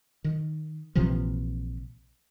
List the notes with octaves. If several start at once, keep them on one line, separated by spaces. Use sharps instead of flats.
D#3
A#1 C3 E3 F3